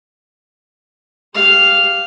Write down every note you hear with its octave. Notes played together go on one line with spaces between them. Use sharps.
G4 F5